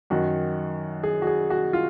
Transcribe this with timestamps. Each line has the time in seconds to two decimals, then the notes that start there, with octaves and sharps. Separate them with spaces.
0.10 F#2 D#3 F#4
1.03 G#4
1.22 F#4
1.27 G#4
1.50 F#4
1.73 F4